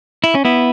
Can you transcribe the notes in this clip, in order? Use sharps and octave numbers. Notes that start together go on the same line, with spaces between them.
E4
C#4
B3 E4